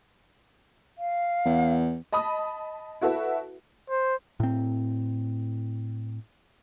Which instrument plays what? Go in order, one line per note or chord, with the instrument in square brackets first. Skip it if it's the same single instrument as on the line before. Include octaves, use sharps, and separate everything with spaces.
[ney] F5
[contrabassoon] E2
[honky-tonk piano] D#5 A5 B5 D#6
E4 F#4 A4 B4 E5
[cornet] C5
[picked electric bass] A2 C4